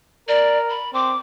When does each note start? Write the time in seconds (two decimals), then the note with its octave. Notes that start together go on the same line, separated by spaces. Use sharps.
0.28 A#4 D5
0.70 B5
0.94 C4 D6